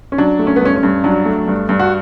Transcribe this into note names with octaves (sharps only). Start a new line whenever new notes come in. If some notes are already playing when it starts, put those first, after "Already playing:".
C#4
F#3 D4
A3
C#4
B3
G2 C#4
C#4
G2
F#3 D4
A3
G2
G2
F#4